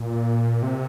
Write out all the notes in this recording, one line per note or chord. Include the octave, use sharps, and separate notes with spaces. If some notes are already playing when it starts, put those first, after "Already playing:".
Already playing: A#2
C3